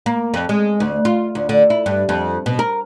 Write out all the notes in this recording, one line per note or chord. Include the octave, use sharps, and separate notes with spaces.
A#3
F2
G#3
D2
F4
D2
D3
E4
G2
F2
B2
A#4